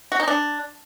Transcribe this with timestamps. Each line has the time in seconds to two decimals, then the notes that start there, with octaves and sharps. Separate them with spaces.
0.12 F#4
0.20 D#4
0.28 D4